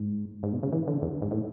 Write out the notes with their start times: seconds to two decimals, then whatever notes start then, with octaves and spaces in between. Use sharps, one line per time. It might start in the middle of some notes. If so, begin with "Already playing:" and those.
Already playing: G#2
0.43 G#2
0.53 B2
0.63 C#3
0.72 E3
0.87 D3
1.02 E2
1.22 G#2
1.31 A2